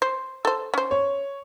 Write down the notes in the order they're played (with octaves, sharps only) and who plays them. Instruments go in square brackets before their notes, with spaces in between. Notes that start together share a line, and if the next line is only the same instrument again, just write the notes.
[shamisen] C5
A4 C5
C#4 C5
[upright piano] C#5